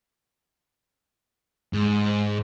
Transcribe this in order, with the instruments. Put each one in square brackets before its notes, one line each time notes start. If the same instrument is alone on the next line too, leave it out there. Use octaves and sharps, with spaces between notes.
[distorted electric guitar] G#2